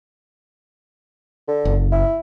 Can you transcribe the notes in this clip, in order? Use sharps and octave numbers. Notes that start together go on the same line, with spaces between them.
D3
F#1
E4